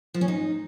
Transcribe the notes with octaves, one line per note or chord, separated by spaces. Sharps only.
F3
C#4
D#4